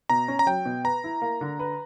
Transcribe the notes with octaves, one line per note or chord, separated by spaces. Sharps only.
B2 A#5
C#4
A#5
F#3 G5
B2
B4 A#5
E4
A#3
D3
B4